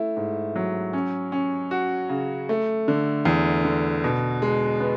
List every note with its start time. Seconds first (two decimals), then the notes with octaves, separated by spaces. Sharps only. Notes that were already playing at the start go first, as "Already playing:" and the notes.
Already playing: A3 E4
0.17 G#2
0.56 F#3
0.93 C#4
1.32 C#4
1.71 F#4
2.09 C#3
2.49 A3
2.88 D3
3.25 E2
3.65 D3
4.04 B2
4.42 G#3
4.80 B3